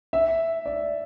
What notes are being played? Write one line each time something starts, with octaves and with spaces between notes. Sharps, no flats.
E5
D5